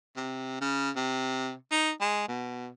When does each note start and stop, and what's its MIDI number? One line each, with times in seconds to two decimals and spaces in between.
0.16 0.57 48
0.61 0.91 49
0.96 1.54 48
1.72 1.91 63
2.01 2.26 56
2.28 2.69 47